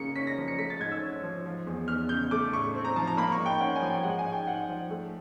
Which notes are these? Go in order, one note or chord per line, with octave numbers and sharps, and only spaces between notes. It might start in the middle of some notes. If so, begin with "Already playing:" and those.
Already playing: C#3 A#3 C#7
C#4 B6
A#6
F3
C#7
A3 B6
A6
G#2 G#6
E6
C#4
F3
F3
E2
E2 F6
C#3 G6
A3 D6
A2 C#6
C4
A#5
F3 A5
A#5
A#3 B5
C#6
G#2
G5
C#4 F#5
G#5
F3
G5
G#3 F#5
G#5
G#2
G5
G#2 F#5
F3
A3